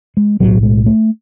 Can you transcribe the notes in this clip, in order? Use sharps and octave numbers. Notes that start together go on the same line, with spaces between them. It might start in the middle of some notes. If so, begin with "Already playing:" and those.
G#3
B1 A2 F#3
G#3
A3